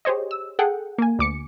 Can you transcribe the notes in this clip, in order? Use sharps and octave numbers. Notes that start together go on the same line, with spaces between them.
G4 G#4 C5 C#5 D#5
E6
G#4 A4 F#5 G5
A#3 G#5
D2 D6 C#7